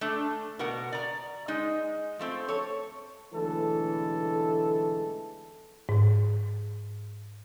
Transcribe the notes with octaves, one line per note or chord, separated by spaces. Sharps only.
A3 D4
B2 A#4 F#5
D5 A#5
G#3 D#4
F3 A3 C4
A4 C#5
B1 D3 E3 G#3 A3 A4
G#2